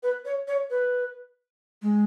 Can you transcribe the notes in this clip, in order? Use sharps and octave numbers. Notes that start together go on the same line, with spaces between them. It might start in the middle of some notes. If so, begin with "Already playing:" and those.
B4
C#5
C#5
B4
G#3